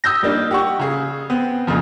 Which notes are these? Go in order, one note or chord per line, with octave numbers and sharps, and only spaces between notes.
D#6 E6 G6 A#6
G3 A#3 D4 D#4
G4 F#5 C#6
C#3 G#4
B3 C4
F2 A#2 C#3 F3